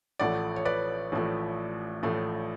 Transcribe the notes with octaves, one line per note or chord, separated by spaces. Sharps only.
A1 A2 F3 A3 D5 F#5
C#5
B4 D5
A1 A2 F3 A3
A1 A2 F3 A3